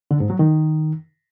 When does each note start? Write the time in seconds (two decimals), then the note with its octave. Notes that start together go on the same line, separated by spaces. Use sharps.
0.11 D3
0.20 G#2
0.30 F#3
0.39 D#3